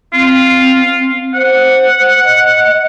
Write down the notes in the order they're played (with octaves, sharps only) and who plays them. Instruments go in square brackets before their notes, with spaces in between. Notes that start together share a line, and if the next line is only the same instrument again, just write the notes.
[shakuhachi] C4 [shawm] F4
[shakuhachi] C5 [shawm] F#5
[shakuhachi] D#5